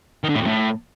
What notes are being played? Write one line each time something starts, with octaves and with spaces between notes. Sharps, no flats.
D#3
D3
A2
F2
A2